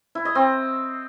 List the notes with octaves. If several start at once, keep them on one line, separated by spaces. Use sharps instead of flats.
E4
D#5
C4